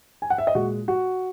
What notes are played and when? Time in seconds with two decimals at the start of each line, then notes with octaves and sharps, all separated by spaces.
0.22 G#5
0.30 F#5
0.38 E5
0.47 D#5
0.55 A#2 G#3 F#4
0.88 F#4